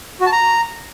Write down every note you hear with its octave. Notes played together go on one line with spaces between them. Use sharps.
F#4
A5
A#5